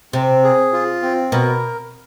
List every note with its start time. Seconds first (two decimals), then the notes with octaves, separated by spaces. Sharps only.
0.13 C3 C4
0.44 G#4
0.73 F4
1.02 C4
1.32 B2 A#4